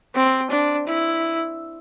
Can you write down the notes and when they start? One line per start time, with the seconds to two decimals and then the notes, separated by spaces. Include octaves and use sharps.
0.15 C4
0.51 D4
0.87 E4